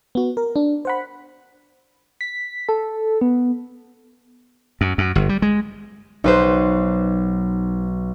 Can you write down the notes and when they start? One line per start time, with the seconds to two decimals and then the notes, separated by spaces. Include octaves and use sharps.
0.15 B3 F#4
0.37 A#4
0.56 D4
0.85 C5 F#5 B5
2.21 B6
2.69 A4
3.21 B3
4.81 F#2
4.98 F#2
5.15 G1
5.29 G3
5.42 G#3
6.24 B1 D#4 B4 C5